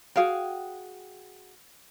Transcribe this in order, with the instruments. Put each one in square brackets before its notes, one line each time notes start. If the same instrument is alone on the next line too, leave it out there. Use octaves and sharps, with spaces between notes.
[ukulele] F#4 G#4 F5 G5